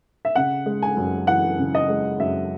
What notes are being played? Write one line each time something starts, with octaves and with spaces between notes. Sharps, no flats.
E5
C#3 F#5
G#3
G#5
F#2
E3 F#5
C#3
D#5
G#3
F#2 E5